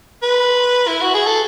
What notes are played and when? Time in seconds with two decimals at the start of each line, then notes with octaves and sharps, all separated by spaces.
0.22 B4
0.88 E4
1.01 F#4
1.14 G#4
1.27 A4